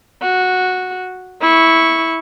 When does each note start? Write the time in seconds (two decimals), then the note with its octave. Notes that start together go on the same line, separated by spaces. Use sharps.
0.22 F#4
1.41 E4 C#6